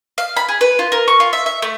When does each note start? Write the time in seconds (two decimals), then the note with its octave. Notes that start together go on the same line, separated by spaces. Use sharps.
0.18 F5
0.36 B5
0.48 G#4
0.61 B4
0.79 F4
0.92 A#4
1.08 C#6
1.20 F4
1.33 E5
1.46 E5
1.62 A3